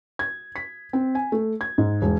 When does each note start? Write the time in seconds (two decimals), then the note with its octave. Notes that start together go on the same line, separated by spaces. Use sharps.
0.19 G#6
0.56 B6
0.93 C4
1.15 G#5
1.32 A3
1.61 G#6
1.78 G#2
2.02 E1